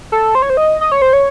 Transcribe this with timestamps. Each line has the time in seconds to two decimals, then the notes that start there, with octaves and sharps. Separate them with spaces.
0.12 A4
0.35 C5
0.42 C#5
0.50 C5
0.57 D#5
0.81 D#5
0.92 C#5
1.02 C5
1.13 C#5